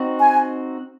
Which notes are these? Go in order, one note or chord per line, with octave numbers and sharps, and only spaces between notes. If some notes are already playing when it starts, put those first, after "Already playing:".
Already playing: C4 D#4 F#4
G#5